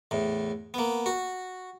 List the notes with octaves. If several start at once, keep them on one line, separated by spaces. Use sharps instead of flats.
E2 A2
A#3 B3
F#4